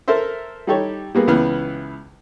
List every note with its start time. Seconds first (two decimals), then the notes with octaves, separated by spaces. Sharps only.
0.08 A4 A#4 C5 E5
0.67 G3 D#4 G4 A4 C#5
1.15 G3 A#3 B3 G#4
1.28 C#2 E3 B3 F6